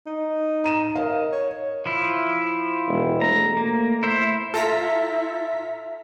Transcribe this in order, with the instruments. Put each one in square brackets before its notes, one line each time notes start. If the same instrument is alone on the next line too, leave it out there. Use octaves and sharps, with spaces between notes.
[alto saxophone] D#4
[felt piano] A#5 D#7 E7
A#4 D#5 F5
[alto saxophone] C#5
[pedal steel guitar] F3 E4
[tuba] E1
[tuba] A3 [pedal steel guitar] A#5
[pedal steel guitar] A#3
E4 C5 E5
[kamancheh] E4 [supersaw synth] F4 A#5 B6 [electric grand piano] A4 [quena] E5